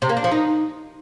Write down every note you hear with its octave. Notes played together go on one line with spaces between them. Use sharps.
C3
A#3
D4
F3
D#4